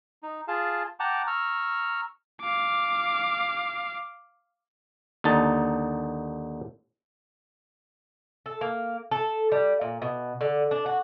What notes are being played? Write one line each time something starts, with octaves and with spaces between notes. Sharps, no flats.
D#4
F4 G#4 F5 A5
F#5 G5 A5 A#5 D6
A#5 C#6 E6 F6
F5 D6
D#2 D3 D#4 A5
A4
A#3
A4
G3
A#2
B2
D3
D4
F#4